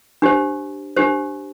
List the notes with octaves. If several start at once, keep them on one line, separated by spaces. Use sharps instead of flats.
D4 G4 C5
D4 G4 C5